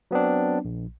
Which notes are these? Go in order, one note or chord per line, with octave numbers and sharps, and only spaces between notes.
F#3 B3 C4 D4
A#1